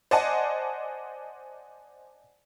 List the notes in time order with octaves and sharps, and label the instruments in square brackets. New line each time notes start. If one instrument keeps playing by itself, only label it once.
[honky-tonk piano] C5 D5 D#5 F#5 G#5 A5